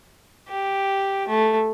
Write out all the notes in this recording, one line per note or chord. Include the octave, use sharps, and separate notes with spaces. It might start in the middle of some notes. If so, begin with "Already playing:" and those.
G4
A3